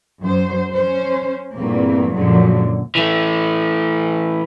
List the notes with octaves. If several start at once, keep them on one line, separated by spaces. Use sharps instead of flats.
F#2 C5
C#4 C5
E2 G2 A#2 A3 A#3 C4
F#2 A#2 D3 F3 F#3 G#3
E3 A3